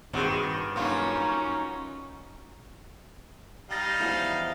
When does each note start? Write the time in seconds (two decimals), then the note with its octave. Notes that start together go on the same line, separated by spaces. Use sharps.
0.13 G2 D#3 C4 F#4 G#4
0.76 F#3 A#3 C#4 D#4 F4
3.70 G3 D#4 F5 G5 A6 A#6
4.00 E2 F3 E4